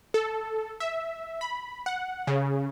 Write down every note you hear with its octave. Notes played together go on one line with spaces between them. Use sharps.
A4
E5
B5
F#5
C#3